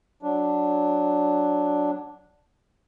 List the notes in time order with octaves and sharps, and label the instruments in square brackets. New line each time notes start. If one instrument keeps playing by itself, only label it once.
[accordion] F#3 D4